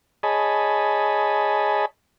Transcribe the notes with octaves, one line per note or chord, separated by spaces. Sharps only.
G#4 C#5 D#5 G#5 A5 B5